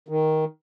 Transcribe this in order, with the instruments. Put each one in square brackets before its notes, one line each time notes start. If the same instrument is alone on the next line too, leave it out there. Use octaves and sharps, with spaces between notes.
[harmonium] D#3